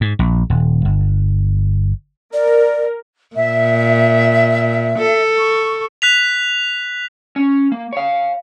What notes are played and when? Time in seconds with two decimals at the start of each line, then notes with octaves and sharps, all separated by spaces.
0.01 G#2
0.19 A#1
0.50 D#1
0.85 G1
2.34 A#4 D5
3.35 A#2 E5
4.98 A4
5.36 C#6
6.02 F#6 B6 F7
7.36 C#4
7.72 A#3
7.93 C#5 F5